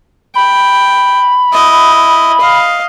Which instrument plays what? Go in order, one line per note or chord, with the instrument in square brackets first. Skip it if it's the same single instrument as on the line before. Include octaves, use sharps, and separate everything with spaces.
[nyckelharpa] G5 [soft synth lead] B5
[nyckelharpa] E4 D#5
D#5 F5